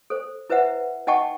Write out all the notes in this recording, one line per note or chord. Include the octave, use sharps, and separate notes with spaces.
A4 C5
E4 B4 C5 E5 F#5
D#4 D#5 F#5 G5 A5 C#6